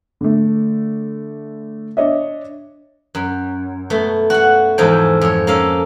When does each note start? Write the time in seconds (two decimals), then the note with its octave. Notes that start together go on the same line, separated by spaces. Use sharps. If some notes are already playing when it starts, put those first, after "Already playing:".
0.21 D3 A3
1.97 D4 C#5 D#5 E5
3.15 F#2
3.90 B2 A3
4.30 F#4 F#5
4.78 E2 G#2 F3 G#4 A4 G5
5.21 F2 C#5
5.47 A#3 C#4 A4 F5